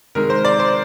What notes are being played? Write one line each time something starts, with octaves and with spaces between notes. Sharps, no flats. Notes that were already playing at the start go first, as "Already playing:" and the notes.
C3 D#3 G#3 A#4
C5
D5
C5